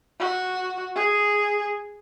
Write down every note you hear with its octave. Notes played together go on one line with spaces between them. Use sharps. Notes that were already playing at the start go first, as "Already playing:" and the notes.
F#4
G#4